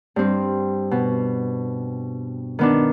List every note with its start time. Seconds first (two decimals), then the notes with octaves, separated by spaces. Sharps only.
0.16 G2 C4
0.91 B2
2.59 D#3 B3 D4